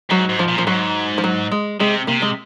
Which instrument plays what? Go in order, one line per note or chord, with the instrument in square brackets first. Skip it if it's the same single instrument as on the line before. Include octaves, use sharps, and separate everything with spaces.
[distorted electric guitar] G#2 [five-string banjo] F#3
[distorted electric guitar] G#2
[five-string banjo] F3
[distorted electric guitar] A#2
[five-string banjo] F3
[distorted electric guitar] G#2 [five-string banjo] F#3
[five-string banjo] F3
F#3
G#3
[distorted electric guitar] C3 [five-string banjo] G#3
[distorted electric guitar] C3 [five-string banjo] A#3
[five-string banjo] G#3